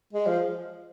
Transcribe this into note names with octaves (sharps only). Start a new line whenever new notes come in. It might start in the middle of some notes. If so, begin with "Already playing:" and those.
G#3
F3